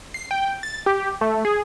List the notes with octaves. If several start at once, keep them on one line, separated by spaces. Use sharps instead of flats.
C7
G5
A6
G4
A3
G#4